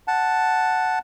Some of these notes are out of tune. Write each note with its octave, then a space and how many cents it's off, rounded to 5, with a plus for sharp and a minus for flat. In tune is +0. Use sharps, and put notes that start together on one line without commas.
F#5 +0 A5 +0